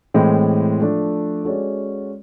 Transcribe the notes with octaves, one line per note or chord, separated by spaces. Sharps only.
A2 E3 G#3 C4
F3 A3 D4
G#3 C#4 F#4 A4 D5